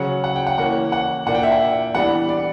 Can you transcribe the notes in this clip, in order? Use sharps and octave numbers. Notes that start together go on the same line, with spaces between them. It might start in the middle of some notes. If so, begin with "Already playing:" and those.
Already playing: C#3 F#3 C#4 F#5
F#5
G5
F#5
E3 A#3 C#4 F#5
F#5
A#2 A#3 D4 F#5
G5
E5
F#5
E3 G3 B3 D4 F#5
D5